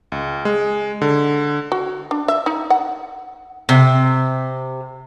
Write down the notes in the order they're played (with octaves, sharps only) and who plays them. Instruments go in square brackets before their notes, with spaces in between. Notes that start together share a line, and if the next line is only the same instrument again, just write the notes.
[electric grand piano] C#2
G#3
D3
[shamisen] F#4
D4
E5
D#4
F#5
[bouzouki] C3